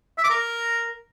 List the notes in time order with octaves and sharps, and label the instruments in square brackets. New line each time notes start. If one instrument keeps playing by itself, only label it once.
[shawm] E5
D6
A#4